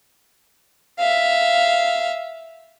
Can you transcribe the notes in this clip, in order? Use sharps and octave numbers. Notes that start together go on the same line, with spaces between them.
E5 F5